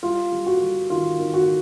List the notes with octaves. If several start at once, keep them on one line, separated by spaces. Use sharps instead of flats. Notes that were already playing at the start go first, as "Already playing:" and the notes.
G3 F4
G3
F#4
G3
D#3 F4
D#3
F#4